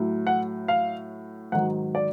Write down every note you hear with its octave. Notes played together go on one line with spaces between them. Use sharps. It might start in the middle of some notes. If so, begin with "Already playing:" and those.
Already playing: A2 F#3
F#5
F5
G#2 D#3 F#3 F#5
D5